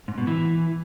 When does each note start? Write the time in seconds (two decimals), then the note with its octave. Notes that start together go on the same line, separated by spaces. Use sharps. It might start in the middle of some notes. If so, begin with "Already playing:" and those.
0.08 G#2
0.18 B2
0.27 E3